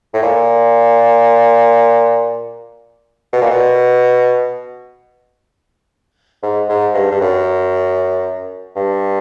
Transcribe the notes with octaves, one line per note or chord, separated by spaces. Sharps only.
A2
A#2
B2
A#2
B2
G#2
G#2
G2
G2
F#2
G2